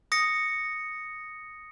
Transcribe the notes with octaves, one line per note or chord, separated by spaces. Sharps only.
D#6 A#6 C#7